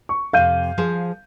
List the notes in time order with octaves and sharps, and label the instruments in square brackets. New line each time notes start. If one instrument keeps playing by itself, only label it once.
[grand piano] C#6
[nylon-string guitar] F2 C3 [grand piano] F5 G6 D#7
[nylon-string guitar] F3 G#4 C5